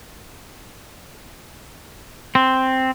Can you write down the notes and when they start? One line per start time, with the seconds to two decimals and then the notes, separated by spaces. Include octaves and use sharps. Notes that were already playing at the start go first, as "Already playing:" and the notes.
2.35 C4